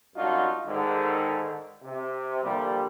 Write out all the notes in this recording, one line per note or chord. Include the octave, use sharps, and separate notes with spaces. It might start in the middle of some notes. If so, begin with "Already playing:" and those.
F#2 G3 D4 D#4 F4 F#4
G#2 D3 D#3
C3
A#2 D3 F3 G3